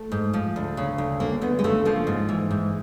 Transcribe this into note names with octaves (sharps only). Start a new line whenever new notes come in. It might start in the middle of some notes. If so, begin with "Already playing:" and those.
Already playing: A3
G#2
F3
D2
C#3
D2
D2 A#3
D2 B3
G#3
C#3 A3
F3 A#3
G#2
E3
G#2